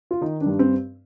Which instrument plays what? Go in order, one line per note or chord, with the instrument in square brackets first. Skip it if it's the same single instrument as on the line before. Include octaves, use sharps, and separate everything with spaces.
[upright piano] F4
D#3 D#4
D4
G2
C4